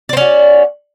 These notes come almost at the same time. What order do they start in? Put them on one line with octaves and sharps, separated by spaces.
D5 C4 C#4 F#4